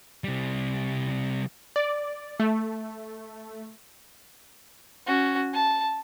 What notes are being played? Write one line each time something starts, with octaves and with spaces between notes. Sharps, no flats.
C3 G3
D5
A3
C#4 F#4
A5